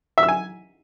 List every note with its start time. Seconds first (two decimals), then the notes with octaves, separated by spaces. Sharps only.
0.18 E5
0.23 E6
0.28 G#5